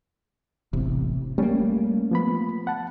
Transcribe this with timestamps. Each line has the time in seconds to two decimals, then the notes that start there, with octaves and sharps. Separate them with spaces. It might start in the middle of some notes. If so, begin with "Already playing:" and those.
0.73 E1 A1 C3
1.38 G3 A3 A#3 C#4
2.11 F3 B3 B5
2.67 F#5 A5